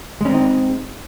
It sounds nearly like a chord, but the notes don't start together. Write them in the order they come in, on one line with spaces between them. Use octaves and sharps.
G#3 C#4 C4 D#4